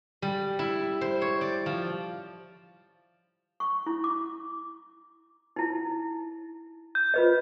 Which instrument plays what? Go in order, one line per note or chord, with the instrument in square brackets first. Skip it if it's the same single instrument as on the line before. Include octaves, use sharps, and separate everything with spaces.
[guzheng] G3
E4
C5
C#5
D5
F3
[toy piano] C#6
E4
D6
D#4 E4
[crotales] G6
[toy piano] F4 B4 D#5